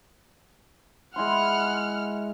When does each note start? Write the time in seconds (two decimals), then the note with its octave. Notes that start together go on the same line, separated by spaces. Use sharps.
1.16 G#3 E4 F#5 C6 F6